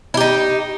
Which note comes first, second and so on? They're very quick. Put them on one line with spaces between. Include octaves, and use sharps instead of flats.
E4 G4 D#4